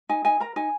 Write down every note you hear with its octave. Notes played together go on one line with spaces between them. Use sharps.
D#4 G#5
D#4 G#5
A#4 A#5
D#4 G#5